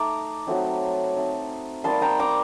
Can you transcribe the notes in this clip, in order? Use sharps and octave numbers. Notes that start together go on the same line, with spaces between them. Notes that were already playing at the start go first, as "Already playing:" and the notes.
Already playing: A3 D#4 A#5 D6
F#3 A3 C4 D#4
A3 C4 D#4
G3 A#3 D#4 A5 C6
G5 A#5
A#5 D6